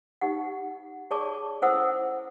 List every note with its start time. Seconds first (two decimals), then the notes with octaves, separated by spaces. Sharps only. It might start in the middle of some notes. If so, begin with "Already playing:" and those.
0.21 D#4 G4 F#5
1.11 G#4 C#5 D5 A5 C#6 D6
1.62 C#4 E4 A4 C5 F#5 E6